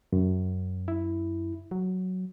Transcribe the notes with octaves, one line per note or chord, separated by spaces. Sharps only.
F#2
E4
F#3